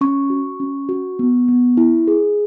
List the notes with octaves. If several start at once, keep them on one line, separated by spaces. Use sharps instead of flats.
C#4 C#6
F#4
C#4
F#4
B3
B3
E4
G#4